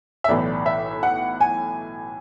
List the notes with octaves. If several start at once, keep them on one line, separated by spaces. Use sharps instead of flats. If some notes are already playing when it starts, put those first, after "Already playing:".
E5
B1 A2 E3 D5
E5
F#5
G#5